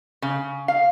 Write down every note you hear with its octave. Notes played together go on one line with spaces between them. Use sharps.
C#3
F5